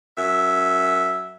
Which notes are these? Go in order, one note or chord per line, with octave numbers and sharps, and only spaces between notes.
F#2 E5